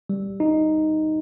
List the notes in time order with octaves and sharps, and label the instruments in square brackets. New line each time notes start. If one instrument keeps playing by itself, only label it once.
[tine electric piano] G3
D#4